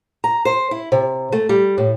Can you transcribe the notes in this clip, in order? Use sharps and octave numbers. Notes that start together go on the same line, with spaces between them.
A#5
C5
E4
C3
A3
G3
A2